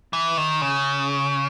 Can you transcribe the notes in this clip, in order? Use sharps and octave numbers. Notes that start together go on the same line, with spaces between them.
E3
D#3
C#3